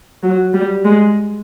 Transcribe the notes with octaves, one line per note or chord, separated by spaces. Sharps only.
F#3
G3
G#3